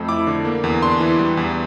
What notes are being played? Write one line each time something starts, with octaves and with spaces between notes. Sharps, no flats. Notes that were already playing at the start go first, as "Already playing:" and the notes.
Already playing: F2 A3 E6
E4 D6
D3
A#3
E2
D4 C6
E3
G3
E2